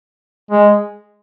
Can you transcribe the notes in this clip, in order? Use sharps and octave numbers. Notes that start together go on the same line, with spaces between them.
G#3